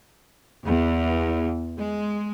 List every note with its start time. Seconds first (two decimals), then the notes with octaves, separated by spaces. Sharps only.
0.65 E2
1.78 G#3